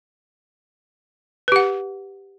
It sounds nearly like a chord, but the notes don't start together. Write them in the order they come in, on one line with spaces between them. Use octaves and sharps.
B4 G4 F#5